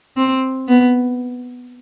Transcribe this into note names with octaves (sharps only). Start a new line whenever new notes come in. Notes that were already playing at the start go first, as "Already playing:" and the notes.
C4
B3